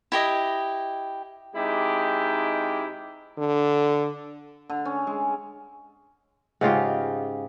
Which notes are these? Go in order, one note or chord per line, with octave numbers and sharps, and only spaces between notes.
E4 G4 D#5
C3 G#3 D#4 E4 G4
D3
D3
C#4
G#3
G#2 C#3 F4 G4